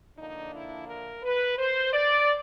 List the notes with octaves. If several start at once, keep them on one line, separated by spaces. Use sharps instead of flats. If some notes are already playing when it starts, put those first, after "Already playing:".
D3 F3 A#3 D4 D#4
E4
A#4
B4
C5
D5